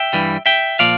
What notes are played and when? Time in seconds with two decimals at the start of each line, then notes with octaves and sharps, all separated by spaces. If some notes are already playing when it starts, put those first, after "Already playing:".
Already playing: E5 G5
0.13 G2 E3 G3
0.46 E5 G5
0.79 A#2 F3 D5 F5